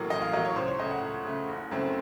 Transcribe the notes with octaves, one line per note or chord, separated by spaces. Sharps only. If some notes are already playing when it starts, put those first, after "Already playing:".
Already playing: A1 A2 F#3 A#3 A#4
A1 D#5
F5
A2 F#3 A#3 D#5
C#5
C#2 C5
C#5
C#3 A3 D#5
F#5
C#2
C#3 A3
F#1
F#2 C#3 A3 C4